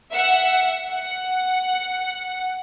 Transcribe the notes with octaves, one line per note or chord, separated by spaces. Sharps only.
E5 F#5
F#5